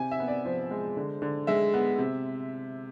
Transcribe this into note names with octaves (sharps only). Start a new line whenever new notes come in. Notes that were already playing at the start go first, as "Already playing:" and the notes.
Already playing: C3 G#5
E5
B3
D5
F3 C5
G#3
D3
D3
G#3 E5
B3
C3